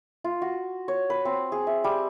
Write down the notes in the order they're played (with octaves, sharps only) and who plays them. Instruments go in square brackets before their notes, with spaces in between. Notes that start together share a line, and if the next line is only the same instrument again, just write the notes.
[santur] F4
F#4
C#5
B4
C4
G#4
E5
G3